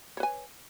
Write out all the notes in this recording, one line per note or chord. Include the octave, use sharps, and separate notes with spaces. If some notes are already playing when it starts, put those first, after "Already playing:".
B4 C#5 G#5